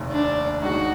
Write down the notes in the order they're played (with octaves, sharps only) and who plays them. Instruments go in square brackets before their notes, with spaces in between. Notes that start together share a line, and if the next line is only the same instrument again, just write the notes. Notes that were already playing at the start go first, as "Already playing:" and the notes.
Already playing: [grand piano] F1 D#2 D#3
[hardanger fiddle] D4
[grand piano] D#2 D#3 G#3 D#4 [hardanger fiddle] F#4